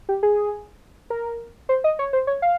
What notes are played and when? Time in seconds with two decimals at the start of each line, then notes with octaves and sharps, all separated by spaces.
0.09 G4
0.23 G#4
1.10 A#4
1.69 C5
1.84 D#5
1.99 C#5
2.13 C5
2.27 C#5
2.42 F5